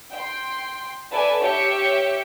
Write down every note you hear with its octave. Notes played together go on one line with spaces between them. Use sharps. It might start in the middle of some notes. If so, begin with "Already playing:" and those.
G5 C6
A4 B4 D5 E5 G#5 A5
G4 C#5 E5 G5 C#7